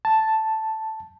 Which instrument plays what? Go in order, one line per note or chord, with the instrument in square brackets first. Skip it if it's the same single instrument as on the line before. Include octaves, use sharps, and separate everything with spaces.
[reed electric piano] A5